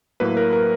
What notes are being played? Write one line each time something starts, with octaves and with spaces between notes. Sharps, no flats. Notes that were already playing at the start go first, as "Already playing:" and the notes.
A2 F#3 A#3 B4
A#4
A#4